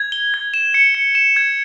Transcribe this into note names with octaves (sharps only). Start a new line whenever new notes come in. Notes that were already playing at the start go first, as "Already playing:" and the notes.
Already playing: G#6
G7
G#6
E7
C#7
C#7
E7
G#6